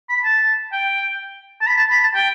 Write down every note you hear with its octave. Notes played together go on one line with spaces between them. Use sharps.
B5
A5
G5
A5
B5
A5
B5
A5
G5